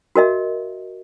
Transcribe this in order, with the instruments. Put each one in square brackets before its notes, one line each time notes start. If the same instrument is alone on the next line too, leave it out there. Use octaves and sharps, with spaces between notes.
[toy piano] F#4 A#4 D#5 E5